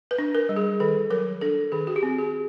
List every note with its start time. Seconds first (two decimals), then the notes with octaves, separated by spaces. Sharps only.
0.11 B4
0.18 D4
0.35 A#4
0.49 G3
0.56 G#4
0.80 D#3 A4
1.10 F#3 A#4
1.41 D4 A4
1.72 D#3 G#4
1.87 F#4
1.96 G4
2.03 C4
2.18 G#4